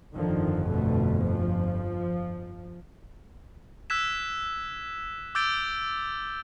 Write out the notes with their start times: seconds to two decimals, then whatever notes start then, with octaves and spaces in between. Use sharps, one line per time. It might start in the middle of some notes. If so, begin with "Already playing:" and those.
0.15 G1 F2 D3 D#3 F3
0.68 B2 D3 A3
1.23 F3
3.90 E6 F#6 G#6 B6 E7
5.35 D6 E6 G6 A6 D7 G7